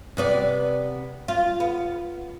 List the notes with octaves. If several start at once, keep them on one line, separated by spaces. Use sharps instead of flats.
C3 B3 D5
F4
B3